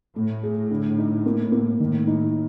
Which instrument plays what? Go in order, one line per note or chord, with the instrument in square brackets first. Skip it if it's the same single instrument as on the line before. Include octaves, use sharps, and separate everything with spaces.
[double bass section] A2 [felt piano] A3
[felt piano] G#4
D3
D#4
A#3
A#3
[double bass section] A2 [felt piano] D#3
[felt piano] D#4